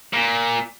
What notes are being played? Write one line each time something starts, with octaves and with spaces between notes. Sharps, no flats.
A#2